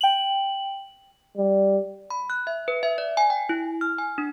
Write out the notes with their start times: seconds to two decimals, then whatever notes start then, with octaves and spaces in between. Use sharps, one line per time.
0.01 G5 F#7
1.37 G3
2.10 B5
2.30 F#6
2.47 E5
2.68 B4
2.83 E5
2.98 D5
3.17 G#5
3.30 G5
3.49 E4
3.81 F6
3.98 G#5
4.18 D4